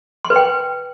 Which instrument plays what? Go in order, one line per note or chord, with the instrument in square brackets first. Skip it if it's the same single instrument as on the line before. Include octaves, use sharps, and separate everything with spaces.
[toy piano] C6
B4
G5